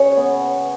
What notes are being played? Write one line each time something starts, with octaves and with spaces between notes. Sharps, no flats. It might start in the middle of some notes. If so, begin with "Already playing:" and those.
Already playing: C#3 C#5
B3